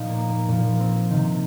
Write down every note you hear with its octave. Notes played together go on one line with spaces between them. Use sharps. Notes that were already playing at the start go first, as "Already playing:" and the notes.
Already playing: A#2 F3 D#4
A#3
A#3
A#2 F3 A#3
C4
C3 D#3